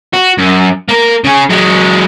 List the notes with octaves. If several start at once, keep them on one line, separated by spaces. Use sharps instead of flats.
F#4
F#2
A#3 A#4
C#3 G#4
F#3 G#3